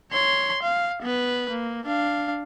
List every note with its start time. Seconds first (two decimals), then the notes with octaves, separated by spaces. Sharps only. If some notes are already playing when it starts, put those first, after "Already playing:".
0.12 C#5 C6
0.63 F5
1.02 B3 B4
1.50 A#3
1.86 D4 F5